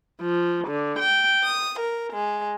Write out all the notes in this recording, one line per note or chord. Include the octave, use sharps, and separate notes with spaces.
F3
D3
G5
D#6
A#4
G#3